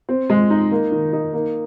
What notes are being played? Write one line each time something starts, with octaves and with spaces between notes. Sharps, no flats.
C4
G#3
D#4
A#3
D#3
D#4
A#3